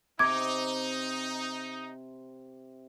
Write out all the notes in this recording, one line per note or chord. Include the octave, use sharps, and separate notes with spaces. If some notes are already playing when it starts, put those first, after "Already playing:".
C3 D#4 D6 G#6